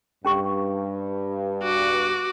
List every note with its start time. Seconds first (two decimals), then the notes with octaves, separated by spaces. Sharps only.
0.25 G2 C#4 G4 C#6
1.63 F#4 D6